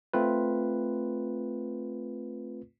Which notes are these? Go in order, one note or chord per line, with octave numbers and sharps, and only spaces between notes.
A3 C4 F4 B4